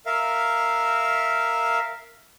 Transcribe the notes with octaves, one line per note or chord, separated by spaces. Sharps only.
A#4 E5 F5